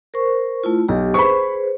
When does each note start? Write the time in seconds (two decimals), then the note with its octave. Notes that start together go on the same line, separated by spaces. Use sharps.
0.14 A#4 C5 C#6
0.64 A3 E4 F4
0.88 B1 G4
1.14 G#4 B4 C5 B5 C#6